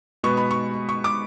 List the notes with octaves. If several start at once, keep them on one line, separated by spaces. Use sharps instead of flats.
B2 G#3 B3 C#6
B5
C#6
C#6
D6